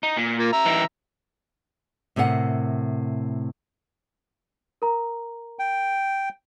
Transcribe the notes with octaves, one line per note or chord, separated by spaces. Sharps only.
D#4
A#2
A#3 F4
E5 A#5
E3 D#4
A2 C3 A#4 C5 F#5
A#4 A#5
G5